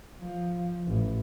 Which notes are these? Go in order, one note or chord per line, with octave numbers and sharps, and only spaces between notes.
F3
A1